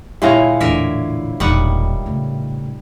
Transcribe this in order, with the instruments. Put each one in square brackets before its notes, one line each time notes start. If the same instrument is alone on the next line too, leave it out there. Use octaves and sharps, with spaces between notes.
[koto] A#2 G#3 A#5 [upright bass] D3 [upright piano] E4 C#5 F5
[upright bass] E2 A2 [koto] D3 A#4 E5
[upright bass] E1 A#2 [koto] D#3 G3 F#5
[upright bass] A2 C#3